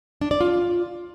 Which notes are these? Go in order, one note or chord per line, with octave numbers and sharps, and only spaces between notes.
D4
D5
F4